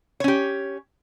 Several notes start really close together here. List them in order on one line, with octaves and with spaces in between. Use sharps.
C#5 C#4 G4